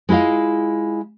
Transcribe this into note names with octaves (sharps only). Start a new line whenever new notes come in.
G#3 E4 F4 D#5 F5